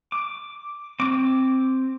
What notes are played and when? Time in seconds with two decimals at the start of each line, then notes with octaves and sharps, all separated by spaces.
0.12 D6
1.00 C4 D6